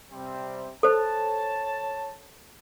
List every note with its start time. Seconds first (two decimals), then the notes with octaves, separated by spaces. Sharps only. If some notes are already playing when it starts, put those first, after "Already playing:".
0.11 C3 G3 C4
0.83 A4 C5 C#5 A5